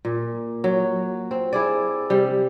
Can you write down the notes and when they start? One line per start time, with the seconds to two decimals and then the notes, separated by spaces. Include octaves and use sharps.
0.05 A#2
0.64 F#3
1.31 C4
1.53 E4 G#4 D5
2.10 C3 G3